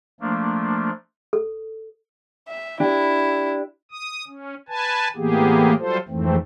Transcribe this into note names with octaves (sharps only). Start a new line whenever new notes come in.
F3 A3 A#3 D4
A4
E5
D4 E4 G4
D#6
C#4
B4 G#5 A5
A2 E3 A#3 B3 G4 G#4
F#3 G3 F4 A4 C5
F2 G#2 E3 A3 C4